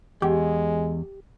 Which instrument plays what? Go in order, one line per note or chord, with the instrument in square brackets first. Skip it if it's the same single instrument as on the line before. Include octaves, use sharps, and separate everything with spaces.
[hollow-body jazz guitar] E2 [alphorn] G#3 [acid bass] G4